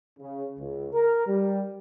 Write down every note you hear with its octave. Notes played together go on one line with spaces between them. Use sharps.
C#3
C#2
A#4
G3